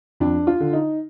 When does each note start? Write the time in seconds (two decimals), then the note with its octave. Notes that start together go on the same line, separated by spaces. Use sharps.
0.20 F2 D4
0.47 F4
0.60 D3
0.73 D#4